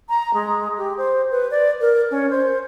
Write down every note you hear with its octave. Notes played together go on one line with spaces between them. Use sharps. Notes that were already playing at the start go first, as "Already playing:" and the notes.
A#5
G#3
G4
C5
B4
D5
A#4
C#4
C5